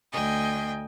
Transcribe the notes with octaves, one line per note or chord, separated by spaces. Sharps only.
D2 D#5 G5 G#5